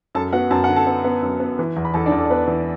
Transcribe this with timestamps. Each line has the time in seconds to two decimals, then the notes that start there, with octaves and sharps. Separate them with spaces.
0.15 F#2 A4 A5
0.33 B3 F#4 F#5
0.51 F#2 A5
0.64 D3 F#5
0.76 A4 A5
0.87 B3
1.04 B3
1.22 F#2
1.40 B3
1.59 E3
1.76 E2
1.85 B5
1.94 E2 A4 A5
2.06 D4 D5
2.12 E2
2.18 A4
2.25 D5
2.30 B3 B4
2.48 E3